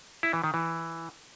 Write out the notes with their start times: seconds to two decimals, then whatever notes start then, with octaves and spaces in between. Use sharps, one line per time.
0.23 E4
0.33 E3
0.44 D#3
0.54 E3